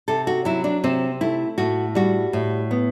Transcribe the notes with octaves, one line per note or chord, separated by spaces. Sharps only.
C3 A4
F#4
F#3 E4
D4
C3 C4
A3 E4
A2 F#4
G3 F#4
A2
B3